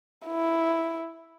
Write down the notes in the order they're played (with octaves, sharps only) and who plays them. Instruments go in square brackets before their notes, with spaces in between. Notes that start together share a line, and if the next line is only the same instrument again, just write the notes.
[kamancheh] E4